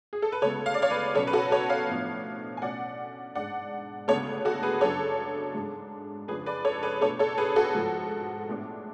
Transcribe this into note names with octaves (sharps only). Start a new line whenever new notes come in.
G#4
A4
B4
D2 C#3 G#3 B3 A4 C#5
F5
D5
C#5 F5
B4 D5
B2 F#3 C#4 A4 C#5
B4
F#4 A4
A4 C#5
C#5 F5
A2 F3 B3 D4
G#5
B2 A3 C#4 D5 F#5
G#2 G#3 D4 D5 F#5
D2 C#3 G#3 B3 D4 A4 C#5
F#4 A4
G#4 B4
F#2 C#3 F#3 A3 D4 A4 C#5
G#2 G#3 D4
F2 C#3 F3 G#3 D4 G#4 B4
B4 D5
A4 C#5
G#4 B4
B2 A3 D4 A4 C#5
A4 C#5
G#4 B4
F#4 A4
G#2 F3 G#3
A2 G#3 B3 D4